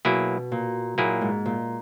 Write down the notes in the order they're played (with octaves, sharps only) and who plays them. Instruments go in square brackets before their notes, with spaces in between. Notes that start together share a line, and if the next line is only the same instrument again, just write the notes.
[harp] B2 [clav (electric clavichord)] F#3 A#3 E4 G#4
[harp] A#2
[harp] A#2 [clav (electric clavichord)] F#3 A#3 E4 G#4
[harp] G#2
A#2